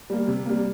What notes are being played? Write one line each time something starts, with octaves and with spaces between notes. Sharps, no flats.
G3 A#3
C3
G3 A#3